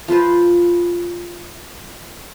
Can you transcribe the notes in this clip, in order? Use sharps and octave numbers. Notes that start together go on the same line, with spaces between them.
F3 F4 B4 C5